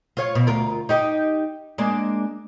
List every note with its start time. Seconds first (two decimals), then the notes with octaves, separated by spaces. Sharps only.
0.17 F4 C#5 F5
0.35 B2
0.47 D2 F4 A#4
0.89 D#4 G4 D#5
1.78 G#3 A#3 D4